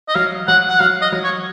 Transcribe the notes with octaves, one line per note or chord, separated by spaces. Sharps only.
D#5
F#3 F5
F#3 F#5
F#5
F#3 F5
D#5
F#3
C#5